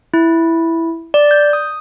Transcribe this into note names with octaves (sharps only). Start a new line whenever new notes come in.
E4
D5
G6
D#6